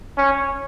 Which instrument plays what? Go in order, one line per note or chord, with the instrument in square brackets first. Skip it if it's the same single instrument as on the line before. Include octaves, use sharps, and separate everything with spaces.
[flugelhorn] C#4